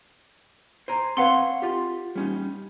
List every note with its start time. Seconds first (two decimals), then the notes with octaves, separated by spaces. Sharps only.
0.88 C5 G#5 A#5
1.17 C4 B4 C#5 F5 F#5 C6
1.62 F4 G4
2.15 G3 C#4 D#4